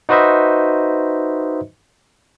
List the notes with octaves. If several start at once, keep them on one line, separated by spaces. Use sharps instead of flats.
D#4 F#4 B4 C5 D#5 E5